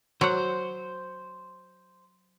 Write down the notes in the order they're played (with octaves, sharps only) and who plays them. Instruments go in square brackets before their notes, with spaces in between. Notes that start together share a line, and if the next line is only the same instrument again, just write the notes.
[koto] F#3 F#5 [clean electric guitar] C5